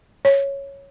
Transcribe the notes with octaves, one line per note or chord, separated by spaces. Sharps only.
C#5